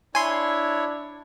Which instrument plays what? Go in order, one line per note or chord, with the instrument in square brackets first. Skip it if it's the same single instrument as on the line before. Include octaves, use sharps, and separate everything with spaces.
[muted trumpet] D4 [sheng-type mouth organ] E4 C#5 [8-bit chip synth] G#5 C6